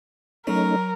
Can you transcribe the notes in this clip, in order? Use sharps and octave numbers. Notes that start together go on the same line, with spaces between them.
F#3 A3 C#4 D#4 A#4